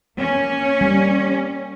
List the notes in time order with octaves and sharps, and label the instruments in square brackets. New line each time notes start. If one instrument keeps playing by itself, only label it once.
[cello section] A#3 C#4
[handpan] G3